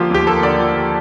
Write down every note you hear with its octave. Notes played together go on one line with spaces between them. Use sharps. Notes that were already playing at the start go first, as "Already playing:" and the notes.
Already playing: D3 F3 A#3 F4 G4
D#2 G4
A#3 A4
D3 D5
F3